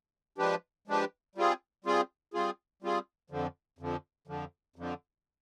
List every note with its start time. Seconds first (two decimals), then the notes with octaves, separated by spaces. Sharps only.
0.38 F3 G#3 D4 G4 B4
0.88 F3 G#3 D4 G4 B4
1.35 G3 C4 F4 G#4
1.84 G3 C4 F4 G#4
2.34 G3 C4 F4 G#4
2.82 G3 C4 F4 G#4
3.30 F2 D3 F3
3.79 F2 D3 F3
4.27 F2 D3 F3
4.76 F2 D3 F3